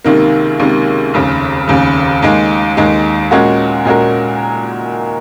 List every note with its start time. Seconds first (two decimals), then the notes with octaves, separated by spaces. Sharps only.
0.05 C#2 C3 D#3 A#3
0.60 C#2 C3 D#3 A#3
1.14 F1 D#2 C#3
1.68 F1 D#2 C#3
2.22 D#2 D#3 G#3
2.77 D#2 D#3 G#3
3.31 A#2 G#3 C#4 F#4 A#4
3.85 A#2 G#3 C#4 F#4 A#4